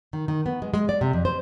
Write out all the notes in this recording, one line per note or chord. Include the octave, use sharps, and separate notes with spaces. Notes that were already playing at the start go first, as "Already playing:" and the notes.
D#3
D#3
B3
G#3
G#3
D5
C3
F2
C5